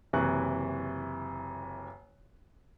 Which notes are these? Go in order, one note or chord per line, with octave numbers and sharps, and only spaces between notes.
F#1 C3 E3 C#6 F#6